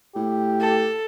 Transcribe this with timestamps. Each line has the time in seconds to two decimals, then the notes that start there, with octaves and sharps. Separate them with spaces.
0.16 A2 G4
0.60 A4